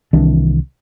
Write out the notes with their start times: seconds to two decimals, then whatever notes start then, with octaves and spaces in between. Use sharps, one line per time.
0.13 C2 D#3 E3 D4